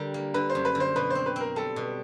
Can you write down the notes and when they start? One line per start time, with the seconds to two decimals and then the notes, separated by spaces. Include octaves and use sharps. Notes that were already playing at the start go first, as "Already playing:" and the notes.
Already playing: D3 G3 A#4
0.14 A#3
0.34 D3 B4
0.50 C5
0.55 F#2
0.65 B4
0.75 D3
0.80 C5
0.96 B2 B4
1.10 C4 C5
1.26 B4
1.36 C4 A#4
1.56 G3 A4
1.76 B2